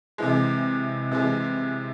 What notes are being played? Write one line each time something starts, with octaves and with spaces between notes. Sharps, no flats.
C3 E3 G#3
C3 E3 G#3